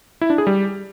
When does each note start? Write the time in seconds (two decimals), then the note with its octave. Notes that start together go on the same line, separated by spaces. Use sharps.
0.21 E4
0.30 D4
0.38 G#4
0.47 G3